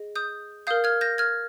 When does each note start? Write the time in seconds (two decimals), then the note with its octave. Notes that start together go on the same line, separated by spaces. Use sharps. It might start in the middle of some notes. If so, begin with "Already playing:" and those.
Already playing: G#4 D#5
0.16 D#6 G6
0.67 A#4 F5 D#6 G6
0.84 F6 G#6
1.01 G6 A#6
1.18 F6 G#6